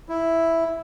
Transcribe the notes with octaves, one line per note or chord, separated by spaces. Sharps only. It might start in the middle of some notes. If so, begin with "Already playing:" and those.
E4